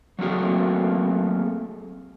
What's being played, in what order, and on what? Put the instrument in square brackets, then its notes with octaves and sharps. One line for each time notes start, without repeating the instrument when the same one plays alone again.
[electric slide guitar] F#3 A3 A#3 C4 F#4 G#4